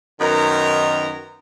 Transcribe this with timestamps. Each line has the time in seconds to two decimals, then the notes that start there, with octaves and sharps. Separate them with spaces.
0.20 F#2 D#3 B3 D#4 A#4 A#5